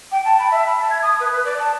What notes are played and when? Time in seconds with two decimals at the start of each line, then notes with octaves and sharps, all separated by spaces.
0.11 G5
0.24 A5
0.39 B5
0.51 E5
0.66 B5
0.78 A5
0.90 G#6
1.02 D#6
1.20 B4
1.31 B4
1.45 D5
1.58 A5